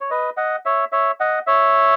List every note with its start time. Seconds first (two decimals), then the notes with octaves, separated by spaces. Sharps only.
0.01 C#5
0.11 B4 D#5
0.37 D#5 F#5
0.66 C#5 E5
0.92 C#5 E5
1.20 D#5 F#5
1.47 C#5 E5